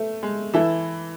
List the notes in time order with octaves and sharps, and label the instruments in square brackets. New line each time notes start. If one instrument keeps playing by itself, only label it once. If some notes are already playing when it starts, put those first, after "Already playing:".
Already playing: [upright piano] A3 [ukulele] B4
[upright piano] G#3
[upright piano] E3 [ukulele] E4 A4 E5